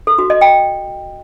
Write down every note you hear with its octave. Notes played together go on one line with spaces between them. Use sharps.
A4
F#4
D#5
G5